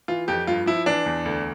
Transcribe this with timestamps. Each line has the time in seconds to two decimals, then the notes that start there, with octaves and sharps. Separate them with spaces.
0.08 E3 F4
0.28 F2 G4
0.47 G2 F4
0.66 F3 E4
0.86 E3 D4
1.06 E2
1.25 D2